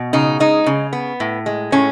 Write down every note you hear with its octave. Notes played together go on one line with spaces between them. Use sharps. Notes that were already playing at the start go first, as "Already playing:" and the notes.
Already playing: B2
C#3 D#4
G#3 D#4
C#3
B3
A2
G#3
A2 C#4